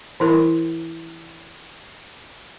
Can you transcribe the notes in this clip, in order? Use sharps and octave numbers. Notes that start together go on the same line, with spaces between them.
E3 E4 A#4